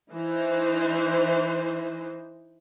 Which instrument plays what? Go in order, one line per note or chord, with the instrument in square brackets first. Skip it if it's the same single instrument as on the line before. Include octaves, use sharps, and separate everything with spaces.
[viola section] E3 D#4 C5